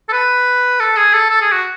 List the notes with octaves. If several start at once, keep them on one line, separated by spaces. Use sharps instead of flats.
A4
B4
A4
G#4
A4
A4
G#4
F#4